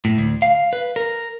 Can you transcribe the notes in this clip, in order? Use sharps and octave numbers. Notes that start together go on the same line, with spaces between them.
A2
D2
F5
B4
A#4